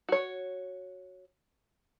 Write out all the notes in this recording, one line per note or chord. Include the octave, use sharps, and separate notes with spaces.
F#4 C#5